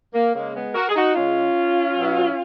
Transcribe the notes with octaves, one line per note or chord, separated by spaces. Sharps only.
A#3
C#3 G#3 A#3
G#3 B3
F#4 A#4
G#4
D#4 F#4
C#3 G#3 C#4 F4
B2 F#3